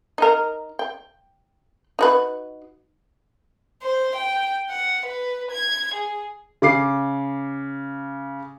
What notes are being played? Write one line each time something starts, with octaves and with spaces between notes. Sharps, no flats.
D#4 A#4
G5
D#4 F#4 B4
C5
G5
F#5
B4
G#6
G#4
C#3 D6 C7